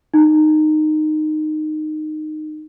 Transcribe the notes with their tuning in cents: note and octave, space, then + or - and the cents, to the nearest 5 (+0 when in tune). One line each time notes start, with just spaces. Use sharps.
D#4 -15